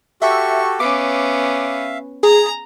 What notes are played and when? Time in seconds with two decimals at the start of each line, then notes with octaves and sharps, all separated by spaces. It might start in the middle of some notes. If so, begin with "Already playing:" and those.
0.22 F#4 G4 A4 E5 C#6
0.80 B3 C#4 E5 F5 D6
2.23 G#4 A#5